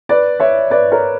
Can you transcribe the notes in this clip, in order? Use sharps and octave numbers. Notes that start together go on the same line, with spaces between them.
B4 D5
C#5 E5
B4 D5
A#4 C#5